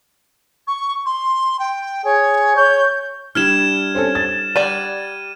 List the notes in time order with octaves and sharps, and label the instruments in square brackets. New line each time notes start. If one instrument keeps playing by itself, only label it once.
[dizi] C#6
C6
G5
[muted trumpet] G#4 [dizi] C#5
[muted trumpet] C#5 [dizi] G6
[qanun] G3 D4 E4 [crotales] F6 G#6 E7
[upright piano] C4 C#4 A4
A6
[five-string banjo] G3 D5 [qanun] F#5 [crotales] D#7